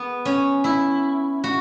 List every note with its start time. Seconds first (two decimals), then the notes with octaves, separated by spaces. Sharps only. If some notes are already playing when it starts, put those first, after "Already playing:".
Already playing: B3
0.25 C#4
0.64 E4
1.44 F#4